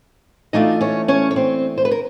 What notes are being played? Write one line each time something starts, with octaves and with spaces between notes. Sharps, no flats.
E3 A3 D4 D#4 F4 D#5
C#4 C#5
C#4 C#5
C#5
C4 C5
C5
B4
A#4